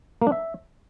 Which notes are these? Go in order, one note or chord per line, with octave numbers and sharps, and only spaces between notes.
A#3
D4
E5